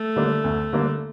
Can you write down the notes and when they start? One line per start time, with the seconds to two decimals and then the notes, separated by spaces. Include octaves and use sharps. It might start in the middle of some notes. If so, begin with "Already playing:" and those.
Already playing: A3
0.16 D3 G3 A#3 D4
0.44 D2
0.73 D3 G3 A#3 D4